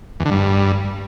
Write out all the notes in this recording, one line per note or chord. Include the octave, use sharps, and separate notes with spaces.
E2
D3
G2